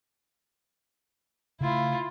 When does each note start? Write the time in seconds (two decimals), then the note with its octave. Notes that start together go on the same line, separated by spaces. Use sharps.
1.61 C#3 A3 E4 F4